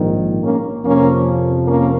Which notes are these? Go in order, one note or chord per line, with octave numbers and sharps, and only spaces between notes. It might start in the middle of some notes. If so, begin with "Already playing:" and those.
Already playing: A#1 G#2 D#3
A#3 C#4
F2 C3 F3 A#3 C#4
A#3 C#4